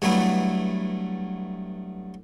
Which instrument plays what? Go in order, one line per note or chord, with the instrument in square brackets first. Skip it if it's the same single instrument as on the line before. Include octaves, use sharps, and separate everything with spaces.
[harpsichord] G2 F#3 A3 B3 E4